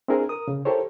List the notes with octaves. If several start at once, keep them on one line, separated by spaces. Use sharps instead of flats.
C4 D4 E4 G#4 A#4
A#4 D#6
C#3
E4 G4 A4 A#4 C5 C#5